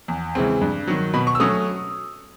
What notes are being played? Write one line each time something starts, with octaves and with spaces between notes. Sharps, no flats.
E2
C#3 E3 G#3 C4
G2
D#3 F#3
B2 B5
C#6
E6
F#3 A3 C#4 D#6